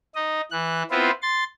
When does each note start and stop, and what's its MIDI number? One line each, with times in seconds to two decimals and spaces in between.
0.15 0.41 63
0.15 0.41 75
0.51 0.83 52
0.51 0.83 90
0.91 1.11 59
0.91 1.11 60
0.91 1.11 64
0.91 1.11 65
0.91 1.11 71
0.91 1.11 72
1.22 1.44 84
1.22 1.44 93